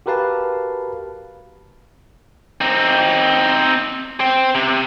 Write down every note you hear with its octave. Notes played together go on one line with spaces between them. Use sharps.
F#4 G4 A#4 B4 F5 A5
C4 D#4
C5 G5
C3